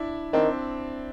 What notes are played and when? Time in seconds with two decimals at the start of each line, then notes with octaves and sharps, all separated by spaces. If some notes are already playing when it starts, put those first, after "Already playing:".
Already playing: D4 E4
0.33 D#3 C4 D4